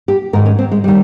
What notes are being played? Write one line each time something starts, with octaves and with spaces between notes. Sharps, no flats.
G4
G#2 D#3 A#4
C#4
C4
G#3
D#3 G3